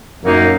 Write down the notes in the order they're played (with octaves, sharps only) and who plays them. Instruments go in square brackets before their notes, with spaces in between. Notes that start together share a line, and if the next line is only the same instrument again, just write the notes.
[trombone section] F#2 [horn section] A#2 F#3 A#3 D#4